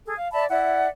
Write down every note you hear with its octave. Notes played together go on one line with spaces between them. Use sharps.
G#4 A4
F5
D5 E5 A5 B5
E4 D5 E5 F#5